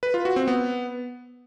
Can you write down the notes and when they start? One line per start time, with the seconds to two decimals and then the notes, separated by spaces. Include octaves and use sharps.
0.03 B4
0.14 F4
0.25 F#4
0.36 C4
0.48 B3